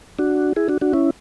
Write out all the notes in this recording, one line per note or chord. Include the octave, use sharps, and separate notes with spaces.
D4 F#4
E4 G#4
D4 F#4
D4 F#4
C#4 E4